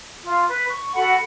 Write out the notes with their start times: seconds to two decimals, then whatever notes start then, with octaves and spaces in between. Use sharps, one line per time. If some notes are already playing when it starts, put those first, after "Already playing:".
0.24 F4
0.48 B4
0.69 C#6
0.95 F#4 A4 F#5 B5